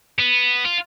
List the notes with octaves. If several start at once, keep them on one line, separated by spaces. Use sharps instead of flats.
B3
F4